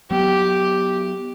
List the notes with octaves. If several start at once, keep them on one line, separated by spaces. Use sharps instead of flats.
F#3 B3 G4